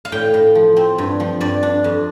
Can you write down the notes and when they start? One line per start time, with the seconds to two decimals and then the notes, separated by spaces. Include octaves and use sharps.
0.05 F5
0.12 A2 G5
0.34 A2
0.55 F3
0.77 C4
0.98 G2
1.20 F3
1.40 G2 D5
1.63 D4
1.84 F2